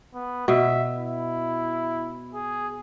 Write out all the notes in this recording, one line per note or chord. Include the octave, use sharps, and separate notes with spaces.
B3
B2 E5
E4
G#4